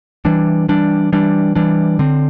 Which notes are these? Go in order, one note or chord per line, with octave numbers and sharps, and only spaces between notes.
E3 G3 D4
E3 G3 D4
E3 G3 D4
E3 G3 D4
D3 C4